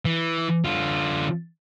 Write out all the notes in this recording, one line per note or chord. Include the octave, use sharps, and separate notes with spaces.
E3
D3 F4